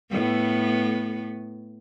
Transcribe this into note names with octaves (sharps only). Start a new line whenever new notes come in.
A2 B3